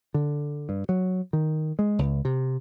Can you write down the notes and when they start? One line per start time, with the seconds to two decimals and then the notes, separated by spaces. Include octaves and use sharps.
0.14 D3
0.69 G2
0.89 F#3
1.33 D#3
1.79 G#3
1.99 C#2
2.25 C3